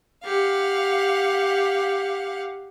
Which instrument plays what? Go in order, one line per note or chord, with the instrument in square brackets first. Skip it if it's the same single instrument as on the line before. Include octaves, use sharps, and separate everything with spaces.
[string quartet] G4 F5 F#5